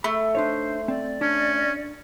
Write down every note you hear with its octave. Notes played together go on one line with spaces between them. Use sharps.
A3 B5
D4 D#4 C5 C#5
C4 D5
C#4 D4